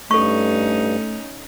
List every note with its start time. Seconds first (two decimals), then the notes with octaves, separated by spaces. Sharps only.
0.11 G2 A3 C#4 D#4 A4 C#6